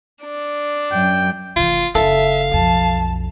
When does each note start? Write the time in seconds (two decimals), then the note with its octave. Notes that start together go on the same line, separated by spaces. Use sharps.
0.23 D4
0.92 F#2 G5
1.56 F1 E3 F4
1.95 F#1 E4 A4 E5 F5
2.52 B1 F2 A5